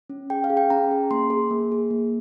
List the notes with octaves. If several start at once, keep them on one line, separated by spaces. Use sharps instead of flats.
C#4
G#4 G5
F5
G#4
G5
C#4 A#5
G#4
A#3 C6
G#4
A#3
G#4
A#3